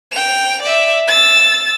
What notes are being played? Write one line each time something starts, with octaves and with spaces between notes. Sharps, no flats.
G5 F7
D5 E5
E6 A6